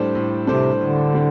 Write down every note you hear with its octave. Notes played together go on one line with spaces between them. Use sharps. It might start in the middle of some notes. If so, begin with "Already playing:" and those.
Already playing: A2 G3 D4 A4 C5
A2
C3 G3 D4 A4 C5
A2 D3
G3 D4